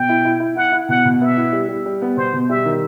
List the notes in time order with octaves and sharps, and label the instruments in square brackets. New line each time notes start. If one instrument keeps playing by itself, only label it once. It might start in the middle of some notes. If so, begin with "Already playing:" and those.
Already playing: [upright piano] B2 [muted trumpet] G5
[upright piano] E4
E4
E4
[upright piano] E4 [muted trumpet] F#5
[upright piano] E4
[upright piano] B2 [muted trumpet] F#5
[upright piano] B2
[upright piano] B3 [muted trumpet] E5
[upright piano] E4
G3
G3
G3
B3
[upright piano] B2 [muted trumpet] C5
[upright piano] B2
[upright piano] G3 [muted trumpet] E5
[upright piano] D#3